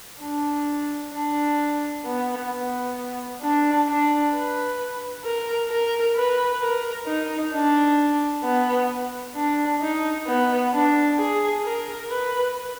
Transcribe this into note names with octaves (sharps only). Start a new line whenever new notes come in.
D4
D4
B3
B3
D4
D4
B4
A#4
A#4
B4
A#4
D#4
D4
B3
D4
D#4
B3
D4
G#4
A#4
B4